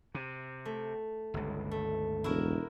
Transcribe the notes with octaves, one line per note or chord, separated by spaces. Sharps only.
C3
A3
G1 C#2
A3
E1 E4 F#4 A#4